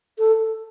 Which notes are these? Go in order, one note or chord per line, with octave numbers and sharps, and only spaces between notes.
A4